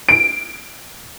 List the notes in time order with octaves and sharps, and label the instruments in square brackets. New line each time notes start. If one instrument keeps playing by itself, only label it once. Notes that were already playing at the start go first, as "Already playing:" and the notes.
[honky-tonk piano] D7